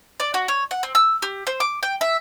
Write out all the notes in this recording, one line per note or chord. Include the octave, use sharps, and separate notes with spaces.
D5
F#4
C#5
F#5
C4
E6
G4
C5
D6
G5
E5